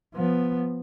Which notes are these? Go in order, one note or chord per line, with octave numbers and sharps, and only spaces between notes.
F3 B3